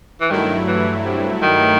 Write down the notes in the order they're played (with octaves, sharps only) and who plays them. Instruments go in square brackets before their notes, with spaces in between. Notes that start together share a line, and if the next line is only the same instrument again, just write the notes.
[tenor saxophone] E3
[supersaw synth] G2 F#3 A3 E4 [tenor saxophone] D#3
[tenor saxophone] E3
C3
D#3